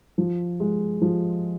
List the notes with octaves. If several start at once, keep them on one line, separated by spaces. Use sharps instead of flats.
F3
G#3
F3